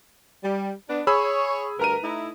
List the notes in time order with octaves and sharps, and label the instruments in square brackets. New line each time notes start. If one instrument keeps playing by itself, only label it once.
[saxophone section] G3
B3 D4
[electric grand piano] G#4 B5 E6 [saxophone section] C#5
[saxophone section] D2 G2 A#4 [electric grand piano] B4 A#5 D#7
[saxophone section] A3 D#4 E4